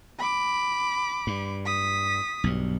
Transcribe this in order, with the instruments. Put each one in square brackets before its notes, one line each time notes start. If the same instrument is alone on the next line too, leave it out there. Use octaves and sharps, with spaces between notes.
[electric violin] B5 D6
[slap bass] G2
[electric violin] D#6 B6
[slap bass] B1 G2